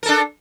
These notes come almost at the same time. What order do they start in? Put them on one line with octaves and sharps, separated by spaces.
A#4 A4 D4